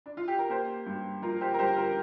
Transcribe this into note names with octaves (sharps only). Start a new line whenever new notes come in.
D4
F4
G4
A#4
A#3 G4 C5
G2
F3 F4 A#4
G4 C5
A#4
G2 G4 C5
F4 A#4